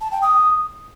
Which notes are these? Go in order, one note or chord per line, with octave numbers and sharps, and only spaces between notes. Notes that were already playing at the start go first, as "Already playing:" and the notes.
A5
G5
D#6